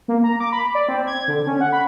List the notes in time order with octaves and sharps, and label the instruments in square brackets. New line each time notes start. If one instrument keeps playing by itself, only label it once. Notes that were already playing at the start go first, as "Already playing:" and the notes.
[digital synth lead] A#3
A#5
D6
B5
D5
C4
G#6
D3
C#4
F#5
B5